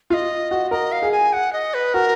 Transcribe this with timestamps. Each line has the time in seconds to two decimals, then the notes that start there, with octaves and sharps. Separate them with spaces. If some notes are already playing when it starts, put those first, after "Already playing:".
0.10 F4 F5
0.14 D#5
0.51 F#4
0.71 A#4 D#5
0.92 F5
1.02 G#4
1.12 G#5
1.33 F#5
1.53 D#5
1.74 B4
1.94 F#4 A#4